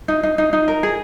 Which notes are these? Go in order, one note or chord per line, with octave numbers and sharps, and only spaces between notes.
D#4
D#4
D#4
D#4
A#4
G#4